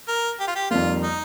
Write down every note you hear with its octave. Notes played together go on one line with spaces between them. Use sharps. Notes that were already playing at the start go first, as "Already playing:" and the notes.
A#4
G4
F4
G4
F2 D#3 G3 A#3 F4
D#4